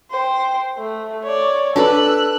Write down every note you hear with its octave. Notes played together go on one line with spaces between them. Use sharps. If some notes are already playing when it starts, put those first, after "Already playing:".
C5 G5
A3
C#5 D5
D4 A4 B4 E6 F#6